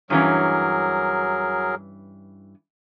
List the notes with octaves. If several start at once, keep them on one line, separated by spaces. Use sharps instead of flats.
G2 E3 F#3 C#4 G#4 A#4